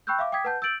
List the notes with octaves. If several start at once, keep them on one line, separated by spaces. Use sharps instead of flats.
G5 B5 C#6 E6 F#6 G6
E5 F5 D6
G5 D6 D#6 G#6 B6
B4 F#5 A5 G6
E6 G6 A6 D7 F#7